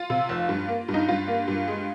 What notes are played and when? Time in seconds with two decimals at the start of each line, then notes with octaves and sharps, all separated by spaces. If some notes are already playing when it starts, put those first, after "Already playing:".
Already playing: F4
0.10 C3
0.29 F1
0.49 G2
0.68 A#3
0.88 G2
0.94 D#4
1.08 G2 F4
1.28 A#3
1.48 G2
1.68 G#3